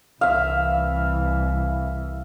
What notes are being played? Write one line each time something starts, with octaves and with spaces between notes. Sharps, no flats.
C2 E3 E5 F5